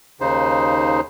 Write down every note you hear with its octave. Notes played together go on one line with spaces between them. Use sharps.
D#2 C#3 D#4 C5